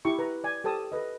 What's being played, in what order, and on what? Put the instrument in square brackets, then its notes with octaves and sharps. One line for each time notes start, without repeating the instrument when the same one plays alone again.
[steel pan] E4 G4 C#6
B4 A#5
D5 G#5
G4 A4 C5 A5 D#6
A4 B4 D#5